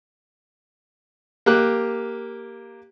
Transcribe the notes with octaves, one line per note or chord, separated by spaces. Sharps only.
A#3 G4 F#6